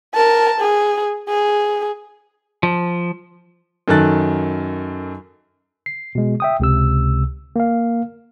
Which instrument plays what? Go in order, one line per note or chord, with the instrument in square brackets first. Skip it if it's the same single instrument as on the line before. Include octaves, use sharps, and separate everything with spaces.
[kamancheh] A#4 A5
G#4
G#4
[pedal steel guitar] F3
[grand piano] F#2 D#3 A4 F#6 A6
[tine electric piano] C7
B2 G#3
E5 G5 D#6
C#2 C3 E6
A#3 F5